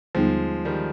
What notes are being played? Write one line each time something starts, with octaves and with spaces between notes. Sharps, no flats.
D#2 D3 F3 G3 G#3 B3 D#4
D#3 G3